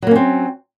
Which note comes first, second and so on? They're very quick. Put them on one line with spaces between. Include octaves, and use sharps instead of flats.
F#3 A#3 C#4 C4